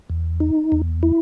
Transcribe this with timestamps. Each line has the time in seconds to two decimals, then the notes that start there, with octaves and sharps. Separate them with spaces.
0.10 E2
0.40 D#4
0.72 E2
1.03 E4